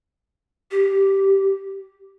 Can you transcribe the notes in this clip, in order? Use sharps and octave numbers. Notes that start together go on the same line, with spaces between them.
G4